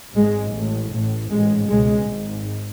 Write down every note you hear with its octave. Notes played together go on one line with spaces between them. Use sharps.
G#1 G#2 G#3
A1 A2
A1 A2
A1 G#2 G#3
C#2 B2 G#3
G#1 G#2